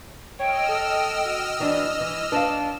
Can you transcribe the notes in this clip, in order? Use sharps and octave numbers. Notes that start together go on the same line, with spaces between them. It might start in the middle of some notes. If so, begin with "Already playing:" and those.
C#5 D#5 G5 E6 F6
A4
F#4
E3 D4
E3
D4 B4 F5 A5